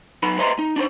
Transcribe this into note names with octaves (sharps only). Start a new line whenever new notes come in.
F#3 B3 D#4 B5
B4 C5 D#5 E5 A#5 C6
D#4
D4 D#4 B4 C5